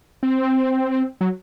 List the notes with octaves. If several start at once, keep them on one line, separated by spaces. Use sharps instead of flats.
C4
F#3